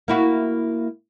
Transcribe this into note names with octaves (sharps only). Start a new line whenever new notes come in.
A#3 E4 F#4